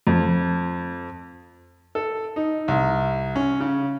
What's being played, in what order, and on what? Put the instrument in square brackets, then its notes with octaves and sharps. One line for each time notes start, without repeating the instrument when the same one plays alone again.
[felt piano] F2
[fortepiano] A4
D#4
C2
C#4
C#3